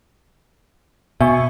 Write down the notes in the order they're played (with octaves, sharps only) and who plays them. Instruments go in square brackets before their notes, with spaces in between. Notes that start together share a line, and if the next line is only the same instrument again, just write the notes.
[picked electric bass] B2 [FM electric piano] E5 G#5 C#6